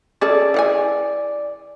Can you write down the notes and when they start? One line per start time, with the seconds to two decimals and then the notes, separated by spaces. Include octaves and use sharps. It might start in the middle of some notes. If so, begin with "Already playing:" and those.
0.21 C#4 G#4 A4 D5
0.54 E3 F#5 G#5